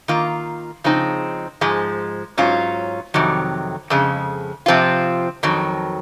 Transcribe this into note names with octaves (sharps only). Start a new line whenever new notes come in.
D#3 A#3 F4
C#3 F3 G#3 C4 D#4
G#2 F3 G#3
G#2 F#3 C#4 F4
F2 C3 D#3 F#3
F2 C#3 G#3
C3 F3 C4 F4
F2 D#3 F#3